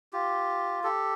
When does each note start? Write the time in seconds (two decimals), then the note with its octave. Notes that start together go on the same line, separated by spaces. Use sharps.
0.13 F4 G4
0.84 G4 A4